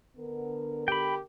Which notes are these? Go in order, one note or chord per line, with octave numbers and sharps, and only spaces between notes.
D3 B3 A#4
G4 G5 B5